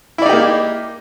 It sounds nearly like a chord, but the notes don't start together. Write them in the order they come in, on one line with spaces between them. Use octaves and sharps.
E4 D5 D#4 G4 A#3